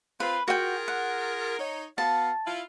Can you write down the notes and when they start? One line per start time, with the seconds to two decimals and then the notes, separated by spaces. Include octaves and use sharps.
0.20 C4 F4 B4
0.48 F4 F#4 G#4 A#4 G5
0.88 F#5
1.59 D#4 C#5
1.98 B3 F#4 F5 A5
2.46 E4 F4